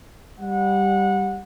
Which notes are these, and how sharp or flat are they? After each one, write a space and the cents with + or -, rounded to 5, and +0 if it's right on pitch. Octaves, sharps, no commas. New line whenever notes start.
G3 +0 F#5 -25